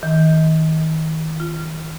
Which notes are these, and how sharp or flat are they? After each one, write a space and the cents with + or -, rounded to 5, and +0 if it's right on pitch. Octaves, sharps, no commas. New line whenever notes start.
D#3 +35
F4 -20